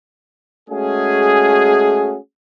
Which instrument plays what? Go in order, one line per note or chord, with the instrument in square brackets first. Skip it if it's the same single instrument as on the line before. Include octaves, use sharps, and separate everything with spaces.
[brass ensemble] G#3 A3 C#4 F#4 G#4